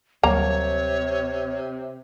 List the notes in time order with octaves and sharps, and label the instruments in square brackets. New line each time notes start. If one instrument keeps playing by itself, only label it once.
[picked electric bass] D2 F#3 G3 [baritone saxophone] C3 [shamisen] A#3 A#5 [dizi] C#5